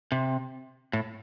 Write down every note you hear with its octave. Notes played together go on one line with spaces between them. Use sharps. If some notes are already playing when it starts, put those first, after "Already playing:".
C3
A2